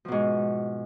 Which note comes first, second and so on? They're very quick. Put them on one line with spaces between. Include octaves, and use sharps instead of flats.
F3 B2 G#2